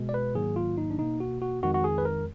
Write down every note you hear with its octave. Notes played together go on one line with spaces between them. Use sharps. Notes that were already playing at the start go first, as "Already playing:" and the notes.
Already playing: B2 G#3
D5
B4
G#2 D#3 F#3 A#3 G#4
F4
D#4
D4
B2 A#3 D#4
F#4
F#4
F2 D#3 G#3 F#4
F#4
G#4
B4
A#4